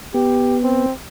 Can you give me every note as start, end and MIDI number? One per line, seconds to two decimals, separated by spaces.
0.14 0.86 59
0.14 0.57 67
0.63 0.92 60